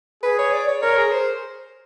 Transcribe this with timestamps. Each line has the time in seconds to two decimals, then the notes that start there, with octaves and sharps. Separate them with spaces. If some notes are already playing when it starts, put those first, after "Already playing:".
0.23 G#4 B4
0.38 C#5
0.52 D5
0.68 C#5
0.82 A#4 C#5
0.97 G#4
1.12 C5